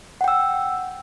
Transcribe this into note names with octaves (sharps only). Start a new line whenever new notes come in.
F#5 G5 E6